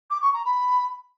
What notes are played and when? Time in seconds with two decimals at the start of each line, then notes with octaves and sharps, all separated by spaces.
0.10 D6
0.22 C#6
0.33 A#5
0.45 B5